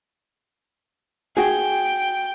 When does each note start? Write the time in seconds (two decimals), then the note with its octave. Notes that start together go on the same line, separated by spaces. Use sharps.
1.37 F#4 G#4 G5